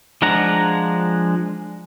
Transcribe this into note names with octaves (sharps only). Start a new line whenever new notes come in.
F3 G#3 D4 F#5 A#5